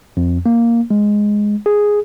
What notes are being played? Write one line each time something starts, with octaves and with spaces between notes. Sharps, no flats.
F2
A#3
G#3
G#4